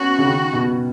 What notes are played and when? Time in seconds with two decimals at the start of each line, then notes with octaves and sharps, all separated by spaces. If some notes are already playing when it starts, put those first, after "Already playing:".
Already playing: B3 C#4 F#4
0.18 C#3
0.26 D#3
0.52 B2